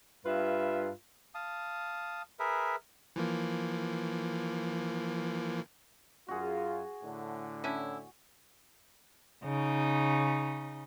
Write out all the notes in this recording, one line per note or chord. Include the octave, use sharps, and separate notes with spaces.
G2 F4 B4 E5
F5 A5 D#6
G#4 A#4 B4 E5
E3 F3 A#3
F#2 F4 F#4 G#4
A2 D3
C#4 D4 E4
C#3 D#4